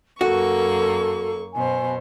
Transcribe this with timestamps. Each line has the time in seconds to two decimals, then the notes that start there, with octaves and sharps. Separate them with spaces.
0.21 F#2 A#3 F#4 A4 C#6
1.53 F#2 B2 C5 G#5